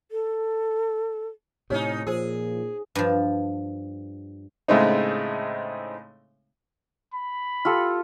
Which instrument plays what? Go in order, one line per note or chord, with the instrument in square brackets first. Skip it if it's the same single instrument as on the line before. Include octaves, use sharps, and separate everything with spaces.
[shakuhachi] A4
[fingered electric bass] A2 C3 [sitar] C#4 D#4 [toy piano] G4 C#5 E6
[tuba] A#2 [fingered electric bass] F3 [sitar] G#4 [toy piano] C5 E6
[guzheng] G2 F3
[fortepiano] A2 C#3 G#3 A3 C4 D#4
[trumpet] B5
[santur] F4 G4 A4